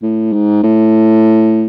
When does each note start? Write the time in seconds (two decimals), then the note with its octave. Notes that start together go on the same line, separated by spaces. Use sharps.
0.02 A2
0.33 G#2
0.63 A2